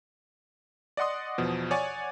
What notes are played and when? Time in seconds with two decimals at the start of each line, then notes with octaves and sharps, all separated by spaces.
0.97 D5 D#5 F#5 C6 D#6
1.38 E2 B2 F3
1.71 C#5 D5 F#5 G#5 C#6 A6